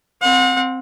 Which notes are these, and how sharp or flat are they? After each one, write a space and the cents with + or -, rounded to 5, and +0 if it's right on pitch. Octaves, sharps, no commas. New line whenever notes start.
C4 +0 F#5 -40